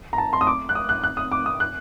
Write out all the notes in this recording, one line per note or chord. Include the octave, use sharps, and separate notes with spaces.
A#5
A5
C6
D#6
D6
F#6
D#6
F#6
F#6
D#6
D6
D#6
F#6